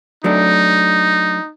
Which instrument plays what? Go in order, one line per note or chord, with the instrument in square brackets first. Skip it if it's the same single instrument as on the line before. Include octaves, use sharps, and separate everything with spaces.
[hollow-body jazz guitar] F#3 A3 D4 [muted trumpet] D#4